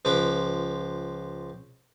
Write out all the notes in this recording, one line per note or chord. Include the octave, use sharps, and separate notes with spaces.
C#2 F3 B4 D6